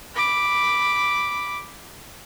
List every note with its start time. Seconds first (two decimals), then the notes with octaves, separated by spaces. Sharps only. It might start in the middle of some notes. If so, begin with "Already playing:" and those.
0.14 B5 D6